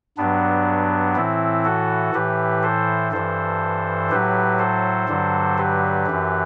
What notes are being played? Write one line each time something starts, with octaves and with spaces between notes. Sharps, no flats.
G2 F#3 B3 D4
A2 E3 C4 E4
F#4 A4
A2 E3 G4 B4
A4 C5
G2 E3 A4 C5
A2 F#3 G4 B4
A4 C5
G2 D3 F#3
G4 B4
F#2 E3